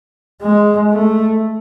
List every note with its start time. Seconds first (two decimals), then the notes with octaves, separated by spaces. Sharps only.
0.42 G#3
0.91 A3